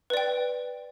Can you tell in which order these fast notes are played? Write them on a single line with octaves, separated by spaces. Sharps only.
B4 D5 G5